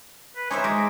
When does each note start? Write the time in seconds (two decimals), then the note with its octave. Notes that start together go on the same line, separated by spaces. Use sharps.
0.36 B4
0.51 D#4 C5 C#5 E5 G#5 D6 G#6
0.64 G#3 D6 D#6 A#6 B6